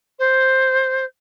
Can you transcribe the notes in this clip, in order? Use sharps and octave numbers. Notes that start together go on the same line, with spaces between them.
C5